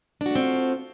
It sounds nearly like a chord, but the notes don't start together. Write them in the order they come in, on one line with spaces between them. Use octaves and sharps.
D4 F#4 A3 C4 F4